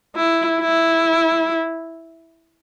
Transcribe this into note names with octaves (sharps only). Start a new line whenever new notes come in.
E4
E4